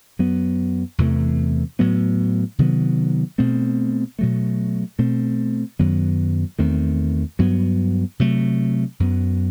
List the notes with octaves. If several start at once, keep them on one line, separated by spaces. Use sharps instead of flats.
F#2 F#3 B3
E2 C3 E3 A3
A2 F#3 B3
C3 D#3 F#3 B3
B2 A3 C4
B2 F#3 A3
B2 A3 C4
F#2 D#3 F#3 B3
E2 D#3 A3 C4
G2 F#3 B3
C3 F#3 A3
F#2 F#3 B3